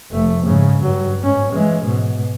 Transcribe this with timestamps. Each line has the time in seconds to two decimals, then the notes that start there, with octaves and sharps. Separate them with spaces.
0.12 F1 A3
0.46 G#2 C#3
0.83 G2 F#3
1.23 G#2 C#4
1.52 E3 G#3
1.83 G#2 B2